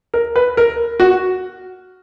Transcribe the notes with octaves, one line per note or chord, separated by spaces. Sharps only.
A#4
B4
A#4
F#4